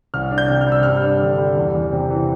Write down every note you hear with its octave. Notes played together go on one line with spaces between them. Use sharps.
C2 F6
D4
G6
C3
F6
G3
E6
G2 F6
D4
D3
G3
E2
E2
C3
E3